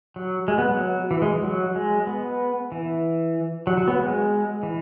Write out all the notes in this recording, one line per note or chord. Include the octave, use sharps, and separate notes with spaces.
F#3
G#3
B3
F#3
E3
G#3
F#3
G#3
B3
E3
F#3
F#3
B3
G#3
E3